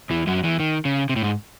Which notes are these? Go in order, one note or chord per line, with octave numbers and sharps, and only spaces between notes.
E2 E3
F#2 F#3
E2 E3
D#3
C#3
C3
A2
G#2